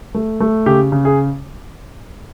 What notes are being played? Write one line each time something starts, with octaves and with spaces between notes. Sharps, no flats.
A3
A3
C#3 G4
C#3
G#4